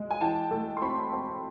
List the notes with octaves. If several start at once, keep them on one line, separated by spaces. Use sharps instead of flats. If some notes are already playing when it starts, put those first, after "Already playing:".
Already playing: G#3
G#5
E3 G5 A5
A3
C6
C4 B5 C#6
C4